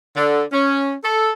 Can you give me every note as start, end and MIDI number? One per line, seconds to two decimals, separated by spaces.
0.15 0.43 50
0.52 0.93 61
1.03 1.30 69